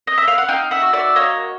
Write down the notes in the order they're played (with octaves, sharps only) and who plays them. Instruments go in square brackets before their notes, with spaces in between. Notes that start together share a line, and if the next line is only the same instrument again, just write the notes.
[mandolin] D#5
E5
F5
F#5
D#4 F5 G5
E5 F#5
F#4
D5 E5
A#3 C#5 D#5